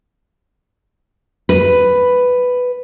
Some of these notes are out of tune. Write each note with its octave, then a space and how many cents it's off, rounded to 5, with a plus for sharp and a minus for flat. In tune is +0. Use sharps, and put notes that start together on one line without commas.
B4 +5